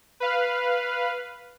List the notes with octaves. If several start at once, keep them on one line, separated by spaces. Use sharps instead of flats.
B4 F5